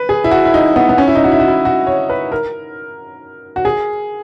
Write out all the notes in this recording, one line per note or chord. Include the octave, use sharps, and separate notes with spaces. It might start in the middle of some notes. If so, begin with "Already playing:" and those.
Already playing: B4
G#4
E4
F#4
E4
D#4
B3
B3
C#4
E4
D#4
F#4
E4
F#4
E4
F#4
C#5
B4
A#4
F#4
G#4